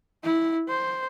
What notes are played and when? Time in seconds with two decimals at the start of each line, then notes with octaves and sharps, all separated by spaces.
0.23 E4
0.68 C5